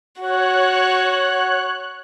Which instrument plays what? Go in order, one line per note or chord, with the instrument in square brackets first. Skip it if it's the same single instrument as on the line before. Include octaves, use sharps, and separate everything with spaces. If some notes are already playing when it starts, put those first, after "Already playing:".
[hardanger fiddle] F#4 [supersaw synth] C#5 F#6